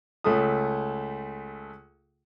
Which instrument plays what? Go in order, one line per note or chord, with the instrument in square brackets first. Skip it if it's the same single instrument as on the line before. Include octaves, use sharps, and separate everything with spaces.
[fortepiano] C#2 A3 A4 D#6